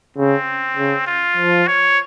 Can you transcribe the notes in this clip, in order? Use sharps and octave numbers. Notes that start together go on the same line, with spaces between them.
C#3 C4
C#3
F4
F3
C#5